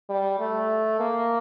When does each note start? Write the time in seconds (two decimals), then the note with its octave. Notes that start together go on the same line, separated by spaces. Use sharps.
0.10 G3
0.40 A3
1.00 A#3